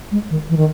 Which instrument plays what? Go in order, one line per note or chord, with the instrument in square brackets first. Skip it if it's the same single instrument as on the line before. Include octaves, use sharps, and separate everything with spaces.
[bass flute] G#3
D#3
E3
D#3